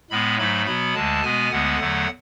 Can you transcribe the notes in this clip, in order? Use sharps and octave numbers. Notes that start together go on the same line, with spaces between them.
A2 G#3 B3 B5
G#2 F#3 A3 B5
B2 F#3 B3 B5
D2 D3 G#3 A5
B2 G#3 B3 G#5
D2 D3 G#3 B3 F#5
E2 D3 F#3 A3